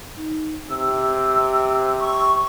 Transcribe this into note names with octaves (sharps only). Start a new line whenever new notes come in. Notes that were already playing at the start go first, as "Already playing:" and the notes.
D#4
C3 E6
C#6